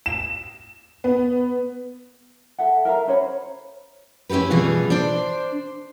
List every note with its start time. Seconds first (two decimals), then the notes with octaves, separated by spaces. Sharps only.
0.06 E7
1.04 B3
2.58 A4 E5 F#5
2.85 A#4 E5 F5 A#5
3.07 C#4 C5 C#5 B5
4.29 C#4 E4 F#4 G4 B4
4.50 B2 E3 G3 F4 G#4
4.90 D4 C5 D5